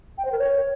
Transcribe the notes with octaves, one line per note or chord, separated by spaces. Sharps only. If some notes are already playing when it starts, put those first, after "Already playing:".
G5
C5
A#4
C#5